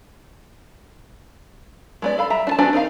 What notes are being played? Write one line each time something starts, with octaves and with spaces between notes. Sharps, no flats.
G#3 B3 D5
A4 F5 B5
G3 E5 A#5
D4 F4 A5
B3 D4 F#4 C5 G#5
C4 D#4 A#4 F5